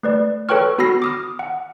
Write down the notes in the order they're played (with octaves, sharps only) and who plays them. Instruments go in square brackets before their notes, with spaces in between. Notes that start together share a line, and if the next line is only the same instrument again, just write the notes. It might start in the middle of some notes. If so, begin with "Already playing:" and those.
[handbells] A3 B4 D5
A4 B4 C#5 G5 C#6 F6
B3 F#4 B5 E6 A#6 C7
D6 D#6 F6
F#5